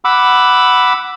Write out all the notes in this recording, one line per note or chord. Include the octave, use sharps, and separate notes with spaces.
F#5 B5 D6 E6